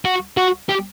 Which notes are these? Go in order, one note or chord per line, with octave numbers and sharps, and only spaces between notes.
F#4
F#4
G4